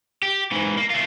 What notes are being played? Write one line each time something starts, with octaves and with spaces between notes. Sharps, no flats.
G4
G#2 E3
A#3
A3 F4